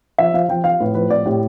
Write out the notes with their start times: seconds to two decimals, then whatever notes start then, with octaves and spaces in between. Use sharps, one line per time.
0.18 F3 E5
0.34 F3 F5
0.49 F3 G5
0.64 F3 F5
0.80 A2 B4
0.95 F3 B4
1.10 A2 D5
1.26 A2 G4